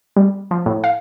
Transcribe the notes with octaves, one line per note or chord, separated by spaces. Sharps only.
G3
F3
A2
F5